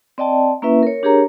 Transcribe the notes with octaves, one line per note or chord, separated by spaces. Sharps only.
C4 D5 D#5 G5 A5
A#3 C#4 E4 B4 E5
A#4 C#5
D4 G4 G#4 A#4 C#5 A#5